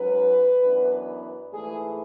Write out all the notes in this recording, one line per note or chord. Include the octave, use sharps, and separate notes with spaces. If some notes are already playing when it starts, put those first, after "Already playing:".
Already playing: G#2 F#3 C#4 B4
F#2 E3 B3 D4
G#2 E3 A3 G#4